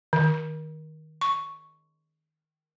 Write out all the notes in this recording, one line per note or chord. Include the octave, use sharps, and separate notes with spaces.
D#3
C#6